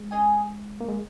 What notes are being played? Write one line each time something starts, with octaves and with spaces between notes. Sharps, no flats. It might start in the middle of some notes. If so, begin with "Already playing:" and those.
Already playing: G#3
C#4 G#4 D#5 G#5
A#3
G#3